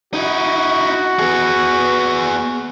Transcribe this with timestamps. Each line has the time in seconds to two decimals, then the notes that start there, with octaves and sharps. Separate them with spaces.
0.14 D#4 E4 F#4
1.19 B3 G#4